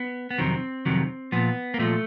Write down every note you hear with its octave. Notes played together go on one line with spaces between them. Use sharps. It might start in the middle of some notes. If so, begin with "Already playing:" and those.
Already playing: B3
B3
F2 C3 D#3 F#3 C4
F2 C3 D#3 F#3
A#2 F3 B3
A#3
A#2 F3 A3